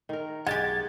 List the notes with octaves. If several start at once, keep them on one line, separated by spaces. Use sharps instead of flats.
D#3 A#4
B1 G#3 G4 F#5 G#6 A6